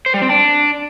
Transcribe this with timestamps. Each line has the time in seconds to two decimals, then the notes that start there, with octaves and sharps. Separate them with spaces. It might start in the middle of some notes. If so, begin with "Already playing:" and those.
0.06 C5
0.14 G3
0.22 C4
0.30 D4